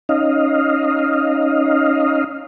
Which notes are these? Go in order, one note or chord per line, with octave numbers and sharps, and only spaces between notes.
C#4 D#4 D#5 F5